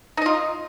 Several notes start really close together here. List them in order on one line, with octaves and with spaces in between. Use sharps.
D#4 D#5 F4